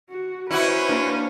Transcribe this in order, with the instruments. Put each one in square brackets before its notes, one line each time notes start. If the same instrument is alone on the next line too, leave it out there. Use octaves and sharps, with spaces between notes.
[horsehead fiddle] F#4
[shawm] C#4 [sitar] E4 F#4 [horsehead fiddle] B4 C5
[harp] A#3 D4